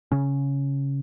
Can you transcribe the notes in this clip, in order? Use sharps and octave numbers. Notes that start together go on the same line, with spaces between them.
C#3 C#4